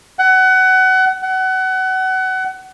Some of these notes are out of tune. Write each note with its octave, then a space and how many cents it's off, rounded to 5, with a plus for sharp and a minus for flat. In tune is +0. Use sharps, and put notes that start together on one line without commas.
F#5 +25
F#5 +25